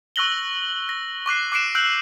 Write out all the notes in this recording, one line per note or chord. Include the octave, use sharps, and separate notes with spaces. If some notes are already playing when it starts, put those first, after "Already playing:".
C#6 E6 F#6 A#6 F#7 G7
A#6
C#6 D6 F#6 C7
D6 F#6 C7 D7 E7
E6 F#6 G6 D7 F#7